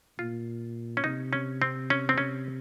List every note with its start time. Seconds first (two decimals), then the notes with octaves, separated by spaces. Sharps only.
0.19 A#2 F4
0.97 C#4
1.04 C3 D#4
1.33 C#4
1.62 C4
1.90 C#4
2.09 C4
2.18 C#4